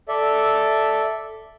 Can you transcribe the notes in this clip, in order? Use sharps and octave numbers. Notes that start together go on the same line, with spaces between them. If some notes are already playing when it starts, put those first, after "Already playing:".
A4 D5 E5